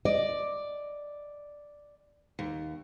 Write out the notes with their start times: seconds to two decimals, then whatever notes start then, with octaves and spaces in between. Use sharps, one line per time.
0.05 D5 D#5
2.39 D#2